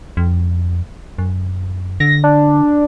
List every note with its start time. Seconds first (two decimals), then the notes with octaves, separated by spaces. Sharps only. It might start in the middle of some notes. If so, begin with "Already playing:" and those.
0.17 F2
1.18 F#2
2.00 D3 A#6
2.24 D4